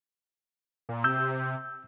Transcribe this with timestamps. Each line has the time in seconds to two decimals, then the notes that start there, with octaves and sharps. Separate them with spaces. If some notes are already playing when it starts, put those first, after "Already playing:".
0.89 A#2
1.04 C3 E6 G6